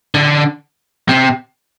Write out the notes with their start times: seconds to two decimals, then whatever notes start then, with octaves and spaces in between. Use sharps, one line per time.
0.15 D3
1.09 C3